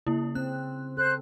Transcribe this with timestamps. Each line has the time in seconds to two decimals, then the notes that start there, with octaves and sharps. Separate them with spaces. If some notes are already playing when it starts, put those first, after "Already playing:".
0.07 C#3 A#3 E4
0.35 C4 F#6
0.97 A4 C5 F#6